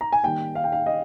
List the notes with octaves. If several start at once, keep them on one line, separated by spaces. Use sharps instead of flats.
A#5
G#5
D#3 G3 A#3 G5
F5
G5
F5
D#5